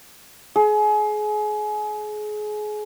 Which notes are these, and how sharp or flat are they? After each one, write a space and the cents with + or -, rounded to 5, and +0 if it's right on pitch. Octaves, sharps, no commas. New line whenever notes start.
G#4 +30